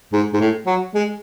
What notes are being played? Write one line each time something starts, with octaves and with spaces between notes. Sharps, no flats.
G#2
G#2
A2
F#3
G#3